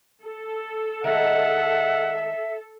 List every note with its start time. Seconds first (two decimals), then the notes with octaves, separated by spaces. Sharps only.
0.23 A4
1.04 D#3 G#3 A3 E5 F#5